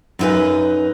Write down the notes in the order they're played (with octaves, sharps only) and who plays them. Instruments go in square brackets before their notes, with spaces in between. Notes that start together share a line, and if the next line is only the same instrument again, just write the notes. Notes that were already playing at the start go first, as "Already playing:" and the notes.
[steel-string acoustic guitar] F#2 C4 D#4 B4 G#5